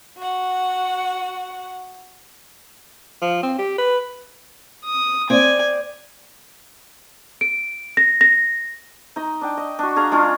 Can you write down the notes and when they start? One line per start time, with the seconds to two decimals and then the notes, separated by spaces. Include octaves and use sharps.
0.18 F#4 F#5
3.22 F3
3.43 C4
3.58 G4
3.78 B4
4.85 D#6
5.30 C4 D5 G#5
7.41 D7
7.97 A#6
8.21 A#6
9.16 D#4 D#5
9.41 D4 G5
9.57 D#5
9.79 D4 F#4
9.96 D4 G#4 F5 A#5
10.12 G#3 C#4 D4 F4